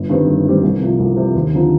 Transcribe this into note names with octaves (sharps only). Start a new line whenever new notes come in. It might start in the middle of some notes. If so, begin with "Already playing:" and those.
Already playing: G1
G2 D#3 G3 C4
G1
G2 D#3 G3 C4
C2
C3 F3
C2
C3
F3
D#2
D3 F3 C4 D#4